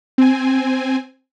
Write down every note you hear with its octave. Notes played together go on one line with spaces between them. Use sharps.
C4 G#5